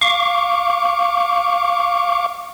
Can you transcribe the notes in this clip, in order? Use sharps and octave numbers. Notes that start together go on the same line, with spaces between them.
F5 C#6 D6